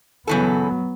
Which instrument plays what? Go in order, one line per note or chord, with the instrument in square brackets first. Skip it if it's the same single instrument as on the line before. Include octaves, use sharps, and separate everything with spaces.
[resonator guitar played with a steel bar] C#3 E3 A4 [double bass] F#3 B3